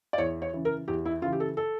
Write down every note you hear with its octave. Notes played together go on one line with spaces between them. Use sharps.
D5
E2 C#5
C#5
C#3 E3
A#4
E2 G4
E4
C#3 E3 F4
G4
A4
A4